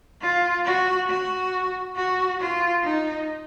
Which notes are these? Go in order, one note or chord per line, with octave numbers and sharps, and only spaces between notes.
F4
F#4
F#4
F#4
F4
D#4